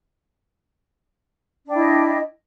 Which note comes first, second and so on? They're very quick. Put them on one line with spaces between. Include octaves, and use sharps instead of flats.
D4 G5 E4 D#5